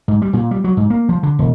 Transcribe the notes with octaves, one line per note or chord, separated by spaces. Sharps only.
G#2
G3
A#2
G3
F#3
G#2
A#3
F3
D3
E1